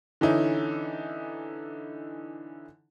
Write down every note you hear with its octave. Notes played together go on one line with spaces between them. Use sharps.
D3 E3 C#4 D#4 E4